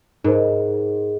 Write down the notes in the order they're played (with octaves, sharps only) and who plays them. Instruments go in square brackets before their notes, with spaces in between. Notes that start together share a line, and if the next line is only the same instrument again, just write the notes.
[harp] G#2 [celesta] D#4 A#4 C5